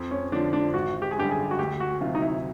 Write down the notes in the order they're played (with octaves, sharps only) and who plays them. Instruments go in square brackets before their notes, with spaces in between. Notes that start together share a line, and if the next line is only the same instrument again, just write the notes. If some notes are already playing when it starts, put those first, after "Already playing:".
Already playing: [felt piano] F2
[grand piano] C#4
[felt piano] D3 F3 [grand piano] D4
[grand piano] D4
[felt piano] G#1 [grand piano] F#4
[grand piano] G4
G#4
[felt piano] F#2 D3 G3 [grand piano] G4
[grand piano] G#4
F#4
[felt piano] D2 [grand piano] G4
[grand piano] F#4
[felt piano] C3 D#3 F#3 [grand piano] F4
[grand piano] D#4
E4